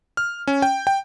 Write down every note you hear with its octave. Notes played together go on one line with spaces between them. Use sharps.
F6
C#4
G5
G5